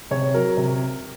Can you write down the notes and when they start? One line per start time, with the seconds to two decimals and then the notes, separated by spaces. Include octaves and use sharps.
0.11 C3 C#5
0.34 F#3 A#4
0.57 C3